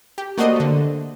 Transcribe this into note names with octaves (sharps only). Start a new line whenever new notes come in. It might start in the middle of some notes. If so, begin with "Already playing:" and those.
G4
A3 A#3 F#4 C5 D5 D#5
D3 A3